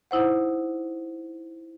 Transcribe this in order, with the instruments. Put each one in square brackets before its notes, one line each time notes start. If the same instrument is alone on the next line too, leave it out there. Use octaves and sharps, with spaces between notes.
[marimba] D#4 E4 C5 F#5